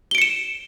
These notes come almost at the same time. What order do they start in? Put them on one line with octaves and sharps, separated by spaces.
G7 D7 C#7 E7